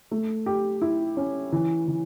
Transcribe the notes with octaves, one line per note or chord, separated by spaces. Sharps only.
A3
G4
E4
C#4
E3
E3